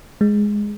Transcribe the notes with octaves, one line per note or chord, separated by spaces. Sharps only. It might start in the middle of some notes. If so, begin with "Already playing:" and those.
G#3